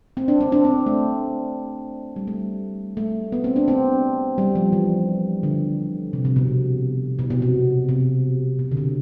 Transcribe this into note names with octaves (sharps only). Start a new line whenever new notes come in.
C4
D4
C4
D4
C4
A3
G3
A3
A3
B3
C4
D4
C4
G3
F3
E3
D3
C3
C3
B2
B2
B2
C3
C3
B2
D3
C3